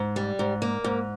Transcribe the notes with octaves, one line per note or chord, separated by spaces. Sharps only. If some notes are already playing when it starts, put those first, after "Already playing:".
Already playing: G#2
G3
G#2
A#3
G#2